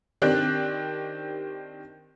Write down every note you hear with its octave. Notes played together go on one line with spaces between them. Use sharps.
D#3 C4 D4 G4 D5 F#6